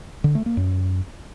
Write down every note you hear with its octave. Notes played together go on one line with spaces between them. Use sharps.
D3
A3
A#3
F#2